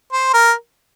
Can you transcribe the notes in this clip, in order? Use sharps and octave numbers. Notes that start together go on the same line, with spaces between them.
C5
A#4